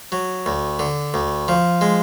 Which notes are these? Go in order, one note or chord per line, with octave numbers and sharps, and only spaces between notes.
F#3
D2
D3
D2
F3
G#3